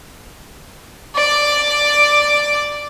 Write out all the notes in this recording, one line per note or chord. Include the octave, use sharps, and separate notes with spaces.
D5 D6